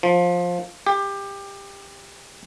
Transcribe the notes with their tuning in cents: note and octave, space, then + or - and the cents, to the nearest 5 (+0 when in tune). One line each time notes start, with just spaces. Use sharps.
F3 +15
G4 +20